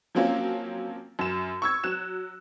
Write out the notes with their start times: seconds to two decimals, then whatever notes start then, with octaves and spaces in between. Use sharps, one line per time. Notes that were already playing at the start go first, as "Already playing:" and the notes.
0.15 F3 F#3 A#3 C4 C#4 F4
1.19 F#2 E7
1.62 C#6 E6 G#6
1.84 F#3 F#6 E7